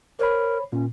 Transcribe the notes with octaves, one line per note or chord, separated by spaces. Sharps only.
A#4 C5 C#5 B5
A#2 C#4